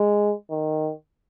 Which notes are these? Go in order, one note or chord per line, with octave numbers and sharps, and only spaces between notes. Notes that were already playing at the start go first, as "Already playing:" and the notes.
Already playing: G#3
D#3